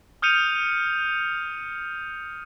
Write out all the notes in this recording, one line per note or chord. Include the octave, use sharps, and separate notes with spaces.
D#6 F6 G6 C#7 D#7 F7